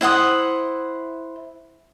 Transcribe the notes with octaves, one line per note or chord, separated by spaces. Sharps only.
E4 C5 F#5 D#6